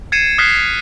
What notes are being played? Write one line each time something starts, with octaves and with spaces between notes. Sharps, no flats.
G#6 A6 C7 C#7 D#7 E7
D#6 F6 F#6 A6 B6 C7